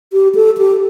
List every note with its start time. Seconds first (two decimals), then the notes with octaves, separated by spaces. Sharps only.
0.13 G4
0.35 A4
0.58 G4